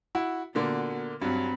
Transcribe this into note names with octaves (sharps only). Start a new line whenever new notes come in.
E4 F#4
A#2 D3 A#3 B3 F#4
G2 F#3 C4 B5